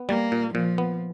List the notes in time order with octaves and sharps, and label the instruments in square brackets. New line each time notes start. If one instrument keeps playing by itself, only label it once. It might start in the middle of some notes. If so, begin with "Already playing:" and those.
Already playing: [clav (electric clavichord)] B3
[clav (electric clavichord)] G3 [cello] A#3
[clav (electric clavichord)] A#2
[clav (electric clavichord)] A#2 [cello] F3
[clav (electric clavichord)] B3